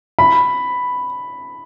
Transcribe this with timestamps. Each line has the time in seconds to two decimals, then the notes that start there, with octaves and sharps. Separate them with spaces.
0.19 B5